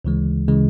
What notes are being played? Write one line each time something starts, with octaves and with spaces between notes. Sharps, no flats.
D2 C#3 E3 G#3
C#3 E3 G#3